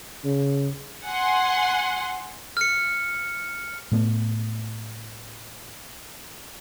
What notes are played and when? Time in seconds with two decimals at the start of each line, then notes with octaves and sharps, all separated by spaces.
0.25 C#3
1.05 F#5 G#5 C6
2.57 F6 C#7
3.92 A2 A3 B3